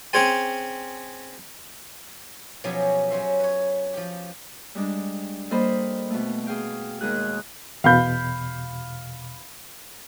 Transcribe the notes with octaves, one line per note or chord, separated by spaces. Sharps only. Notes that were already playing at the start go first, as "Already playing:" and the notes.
C4 C#4 G#4 C5 G#5
B2 F3 F#3 C#4 G4 G#4
F#3 C#4 C5 E5
B4 C#5
F3 G4
G3 G#3 D4
G3 A#3 A4 C5 D#5 B5
B2 A3
G#4 F5 G5
D#2 D#3 G#3 G#4 F#6
E2 B2 F5 B5 G6